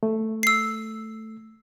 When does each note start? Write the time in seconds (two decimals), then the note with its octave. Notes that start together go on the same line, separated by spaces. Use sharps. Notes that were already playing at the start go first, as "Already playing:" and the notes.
0.03 A3
0.43 E6 C7